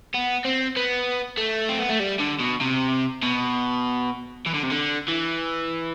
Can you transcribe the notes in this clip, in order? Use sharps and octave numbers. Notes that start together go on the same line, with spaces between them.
B3
C4
B3
A3
C4
B3
A3
G3
D3
B2
C3
B2
E3
D3
C3
D3
E3